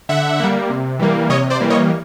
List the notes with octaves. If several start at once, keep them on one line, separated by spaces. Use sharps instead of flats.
D3 E5 F#5
G3 A#3
C3
E3 G3 A#3
C3 C#5 D#5
C5 D5
E3 G3 A#3
C#5 D#5